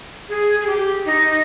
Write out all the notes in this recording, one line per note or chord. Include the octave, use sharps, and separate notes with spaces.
G#4
G#4
G4
D#4